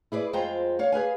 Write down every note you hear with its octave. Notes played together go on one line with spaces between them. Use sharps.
E4 G#4 B4 D5
F2 G#3 F4 C5 G5 A#5
C#5 F5
G#4 B4 F5 G#5